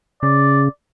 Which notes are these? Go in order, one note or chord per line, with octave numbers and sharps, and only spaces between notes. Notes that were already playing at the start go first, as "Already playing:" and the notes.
C#3 D5